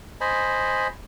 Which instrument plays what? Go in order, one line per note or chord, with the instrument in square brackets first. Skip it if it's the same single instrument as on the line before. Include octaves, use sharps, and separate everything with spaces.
[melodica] C5 D#5 G#5 B5